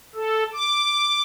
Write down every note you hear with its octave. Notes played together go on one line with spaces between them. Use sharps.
A4
D6